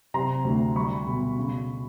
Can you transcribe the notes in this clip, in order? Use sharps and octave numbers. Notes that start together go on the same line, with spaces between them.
C3 A#5 C6
D2
G3 B5 C#6
B2
C#3